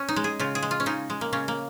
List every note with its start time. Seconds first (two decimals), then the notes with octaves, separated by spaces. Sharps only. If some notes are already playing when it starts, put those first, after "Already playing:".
Already playing: C#4
0.08 D#4
0.16 G#3
0.24 G#4
0.39 C#3 F4
0.55 G#4
0.63 G#3
0.71 F4
0.80 C#4
0.86 C#3 D#4
1.10 G#3
1.21 A#3
1.33 C#3 C#4
1.48 A#3